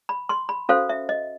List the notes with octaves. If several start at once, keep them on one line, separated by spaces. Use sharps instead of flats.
B5
C6
B5
C#4 F#4 A4 C5 F5
E5
D#5